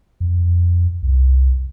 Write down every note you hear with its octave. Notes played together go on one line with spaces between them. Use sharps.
F2
C2